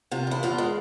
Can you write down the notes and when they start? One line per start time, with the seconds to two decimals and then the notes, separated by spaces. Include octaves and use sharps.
0.11 C3 F4
0.27 E2 E4
0.43 E2 F4
0.58 G#3